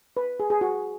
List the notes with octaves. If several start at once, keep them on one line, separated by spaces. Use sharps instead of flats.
B4
G#4
G#4
F#4